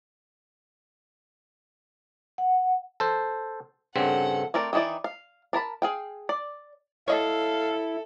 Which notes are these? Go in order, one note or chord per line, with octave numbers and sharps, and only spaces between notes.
F#5
A4 C5
G2 C#3 C4 A4 F#5
A3 C4 A#4 D5
D#3 E3 D#4 E4 D5
F5
D4 A#4 A5 B5
G#4 F5 G5
D5
E4 A4 C#5 D#5 F5